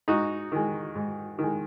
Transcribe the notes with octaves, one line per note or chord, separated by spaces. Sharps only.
G#2 D#4 F#4
D#3 G#3
G#2
D#3 G#3